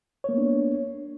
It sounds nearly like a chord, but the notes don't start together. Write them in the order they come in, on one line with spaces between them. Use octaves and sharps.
C#5 A#3 B3 D4